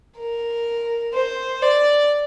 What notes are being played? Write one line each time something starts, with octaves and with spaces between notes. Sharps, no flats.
A#4
C5
D5